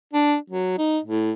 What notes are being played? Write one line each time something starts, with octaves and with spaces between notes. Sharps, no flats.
D4
F#3
D#4
A2